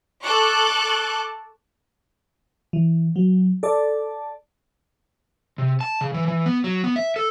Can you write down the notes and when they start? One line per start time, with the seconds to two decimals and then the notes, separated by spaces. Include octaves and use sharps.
0.25 A4 A5 C#6 D6 F#6
2.73 E3
3.16 F#3
3.63 A4 D5 A5
5.58 C3
5.80 A5
6.01 C#3
6.14 E3
6.28 E3
6.46 B3
6.64 F#3
6.84 B3
6.96 E5
7.16 A4